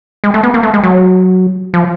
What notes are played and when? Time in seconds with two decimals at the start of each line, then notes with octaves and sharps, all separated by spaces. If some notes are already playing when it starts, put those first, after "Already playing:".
0.24 G#3
0.34 A3
0.43 B3
0.54 A#3
0.63 A3
0.74 G#3
0.84 F#3
1.74 F3